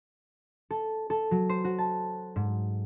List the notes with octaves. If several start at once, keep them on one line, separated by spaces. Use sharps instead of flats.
A4
A4
F#3
C5
F#4
A5
G#2